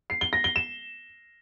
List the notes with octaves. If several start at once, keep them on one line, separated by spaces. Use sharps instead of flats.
C7
G7
A#6
G7
E7